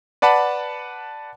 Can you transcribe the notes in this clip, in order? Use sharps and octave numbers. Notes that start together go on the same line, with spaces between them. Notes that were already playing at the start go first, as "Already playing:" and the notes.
B4 D5 F#5 A5 B5